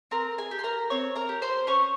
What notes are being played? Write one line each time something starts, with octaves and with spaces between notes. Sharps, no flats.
C4 A#4 A#5
G#4 G#5
G4
C6
A#4 A#5
C4 C#5 C#6
A#4 A#5
G4
C5 C6
C#4 C#5 C#6